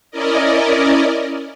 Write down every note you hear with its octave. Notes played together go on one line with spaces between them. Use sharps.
C#4 E4 A#4 D5 D#5